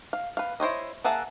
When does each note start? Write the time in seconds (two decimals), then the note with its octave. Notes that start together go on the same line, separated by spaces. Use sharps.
0.13 F5
0.37 B4 F5
0.60 E4 C5 C#5 D#5
1.04 A#3 G#4 E5 F#5 A5